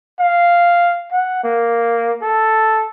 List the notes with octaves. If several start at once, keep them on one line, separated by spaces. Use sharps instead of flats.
F5
F#5
A#3
A4